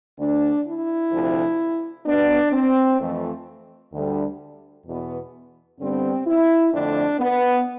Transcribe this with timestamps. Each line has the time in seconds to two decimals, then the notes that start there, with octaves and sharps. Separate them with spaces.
0.19 D2 D3 A3 D4
0.65 E4
1.12 D2 C3 F3
2.06 B2 B3 D4
2.52 C4
2.99 F2 E3 A3
3.92 D2 D3 G3
4.86 E2 B2 B3
5.79 G2 D3 G3 B3 C4
6.26 E4
6.72 F2 D3 A3 D4
7.19 B3